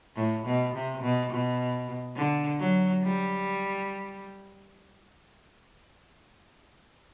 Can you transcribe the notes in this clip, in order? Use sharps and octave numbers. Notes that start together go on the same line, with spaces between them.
A2
B2
C3
B2
B2
D3
F#3
G3